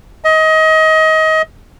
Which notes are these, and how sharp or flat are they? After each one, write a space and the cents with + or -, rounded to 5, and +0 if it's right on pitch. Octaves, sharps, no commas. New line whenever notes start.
D#5 +25